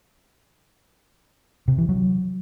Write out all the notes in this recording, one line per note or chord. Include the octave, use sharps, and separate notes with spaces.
C3
E3
F#3